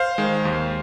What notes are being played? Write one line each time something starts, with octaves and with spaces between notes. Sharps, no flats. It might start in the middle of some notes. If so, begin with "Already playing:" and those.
Already playing: C5 F5
D#3 G#3
D#2